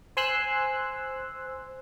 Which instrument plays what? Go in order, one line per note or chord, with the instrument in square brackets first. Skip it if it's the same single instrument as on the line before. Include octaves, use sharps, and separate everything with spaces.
[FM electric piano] C5 G#5 C6 E6 F#6